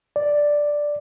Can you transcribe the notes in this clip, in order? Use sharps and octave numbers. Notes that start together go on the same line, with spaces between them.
D5